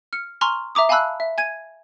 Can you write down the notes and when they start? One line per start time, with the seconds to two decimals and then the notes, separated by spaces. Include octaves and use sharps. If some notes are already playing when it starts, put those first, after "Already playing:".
0.13 F6 C#7
0.41 G#5 A#5 C6 C#6 F6
0.75 E5 A#5 D6 D#6
0.89 F5 G#5 A5 B5 E6 F#6
1.20 E5
1.38 G#5 G#6 D#7